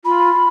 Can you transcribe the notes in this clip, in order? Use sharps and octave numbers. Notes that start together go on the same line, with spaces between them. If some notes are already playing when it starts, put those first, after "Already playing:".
F4 B5